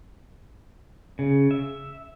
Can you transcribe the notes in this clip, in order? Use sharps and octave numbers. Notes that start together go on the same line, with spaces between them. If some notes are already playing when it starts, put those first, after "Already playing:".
C#3
E5